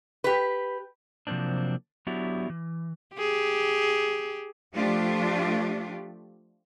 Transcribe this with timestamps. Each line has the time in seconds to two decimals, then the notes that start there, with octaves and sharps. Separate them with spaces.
0.24 G4 B4
1.27 C3 F3 F#3 A#3 C4 D4
2.07 F#3 B3 D4 E4 F#4 G4
2.50 E3
3.16 G4 G#4
4.74 F3 A3 D4 F4 G4